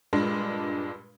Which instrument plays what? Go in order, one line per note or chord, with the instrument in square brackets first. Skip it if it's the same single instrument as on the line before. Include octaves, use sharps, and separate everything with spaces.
[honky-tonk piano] G2 A#2 G#3 D4